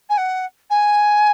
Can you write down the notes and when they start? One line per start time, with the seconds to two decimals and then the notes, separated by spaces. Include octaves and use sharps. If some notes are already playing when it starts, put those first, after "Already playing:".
0.09 G#5
0.17 F#5
0.70 G#5